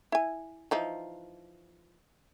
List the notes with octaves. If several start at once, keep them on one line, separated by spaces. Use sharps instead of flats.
E4 G#5
E3 F3 D#4